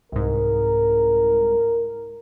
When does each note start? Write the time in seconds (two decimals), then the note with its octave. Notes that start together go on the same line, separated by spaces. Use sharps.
0.12 C2 G#2 A#4